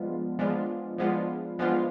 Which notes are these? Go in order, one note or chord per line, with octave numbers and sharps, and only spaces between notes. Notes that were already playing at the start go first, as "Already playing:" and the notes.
Already playing: F3 G#3 B3 D4 F4
F3 G#3 B3 D4 F4
F3 G#3 B3 D4 F4
F3 G#3 B3 D4 F4